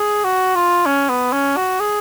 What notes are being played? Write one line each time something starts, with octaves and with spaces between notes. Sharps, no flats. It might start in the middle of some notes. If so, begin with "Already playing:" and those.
Already playing: G#4
F#4
F4
C#4
B3
C#4
F#4
G#4